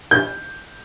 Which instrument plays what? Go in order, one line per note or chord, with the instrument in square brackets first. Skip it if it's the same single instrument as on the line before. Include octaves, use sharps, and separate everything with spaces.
[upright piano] G6